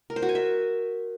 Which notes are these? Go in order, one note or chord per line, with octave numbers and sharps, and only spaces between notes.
A#4
C5
F#4
G#5
E5